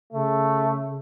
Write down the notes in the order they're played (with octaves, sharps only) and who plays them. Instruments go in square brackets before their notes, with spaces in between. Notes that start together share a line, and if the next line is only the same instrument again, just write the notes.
[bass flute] C#3 [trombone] A3